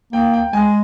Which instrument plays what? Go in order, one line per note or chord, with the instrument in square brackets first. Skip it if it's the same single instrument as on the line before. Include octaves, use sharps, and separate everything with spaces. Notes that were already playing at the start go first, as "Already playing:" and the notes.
[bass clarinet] A#3 [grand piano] G5
[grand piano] G5
[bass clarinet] G#3 [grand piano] G#5